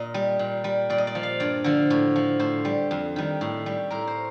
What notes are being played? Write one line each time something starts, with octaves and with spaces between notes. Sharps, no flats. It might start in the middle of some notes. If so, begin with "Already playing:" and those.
Already playing: A#2 D#5
G3
A#2
G3
A#2 D5
D#5
D5
F3
F5
G2 D5
D3 F3
A2
F3
A2 C5
G3
F2
D#3 G3
A2
G3
A2 A#4
C5